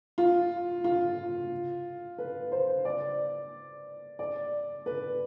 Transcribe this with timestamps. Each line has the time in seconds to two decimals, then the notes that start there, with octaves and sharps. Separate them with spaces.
0.18 F4
0.84 F4
2.18 B4
2.52 C5
2.85 D5
4.19 D5
4.86 B4